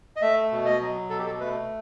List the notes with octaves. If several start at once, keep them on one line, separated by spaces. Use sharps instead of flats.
D#5
A3 E5
B2
D#5
F#3
B2 A4
G4
A4
A3 B4